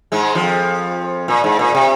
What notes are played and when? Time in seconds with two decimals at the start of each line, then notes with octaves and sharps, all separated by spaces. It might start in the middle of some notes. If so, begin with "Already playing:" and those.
0.12 G#2 G#3
0.35 F2 F3
1.28 A#2
1.44 G#2
1.59 A#2
1.75 C3